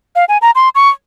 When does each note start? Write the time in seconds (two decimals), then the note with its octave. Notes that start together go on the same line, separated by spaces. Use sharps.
0.16 F5
0.29 G#5
0.42 A#5
0.55 C6
0.75 C#6